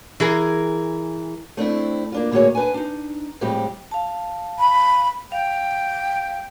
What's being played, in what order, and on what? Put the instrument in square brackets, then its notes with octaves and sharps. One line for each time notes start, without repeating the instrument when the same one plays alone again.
[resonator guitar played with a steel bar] E3 G#4 A#4
[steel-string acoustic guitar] A3 C4 D4 E4
A#3 D4 F4
A2 D3 A#3 F#4 G#4 C#5
D4 B4 F#5 G#5
D4 D#4
F2 A2 G3 G#3 C4 G4
[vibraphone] F5 A5
[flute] B5
[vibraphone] F5 [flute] G5